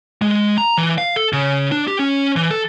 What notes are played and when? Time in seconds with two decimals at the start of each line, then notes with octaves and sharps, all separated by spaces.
0.22 G#3
0.58 A#5
0.78 E3
0.98 F5
1.16 A4
1.33 C#3
1.72 D4
1.87 G4
1.99 C#4
2.36 E3
2.51 A4